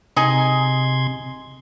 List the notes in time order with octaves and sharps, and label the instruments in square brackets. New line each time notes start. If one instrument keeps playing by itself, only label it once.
[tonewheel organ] C3 C6 G#6 [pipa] D#4 G#4